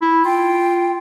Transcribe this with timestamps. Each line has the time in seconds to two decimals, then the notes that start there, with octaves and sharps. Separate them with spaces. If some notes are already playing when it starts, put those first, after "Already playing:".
0.02 E4
0.25 F4 G5